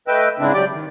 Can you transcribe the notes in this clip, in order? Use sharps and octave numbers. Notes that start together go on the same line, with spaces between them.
A3 B4 D#5 G5 E6
G#2 C#3 C4 D4 E4
F#3 G4 D5 G5 D6
D#3